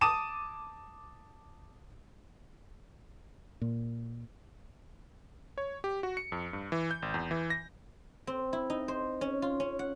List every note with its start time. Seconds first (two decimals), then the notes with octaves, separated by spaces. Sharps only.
0.01 A5 D6 D#6 D#7 E7
3.61 A#2
5.58 C#5
5.84 G4
6.03 F#4
6.17 C#7
6.32 F2
6.53 G2
6.72 E3
6.91 G6
7.02 G#1
7.14 E2
7.31 E3
7.50 A#6
8.27 C4
8.53 E4
8.70 D#4
8.88 C5
9.21 C#4
9.42 F4
9.60 C#4
9.79 F#5